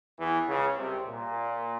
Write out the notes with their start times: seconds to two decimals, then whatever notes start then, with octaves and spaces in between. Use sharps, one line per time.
0.19 E2 E3
0.48 C#2 C#3
0.78 C2 C3
1.07 A#2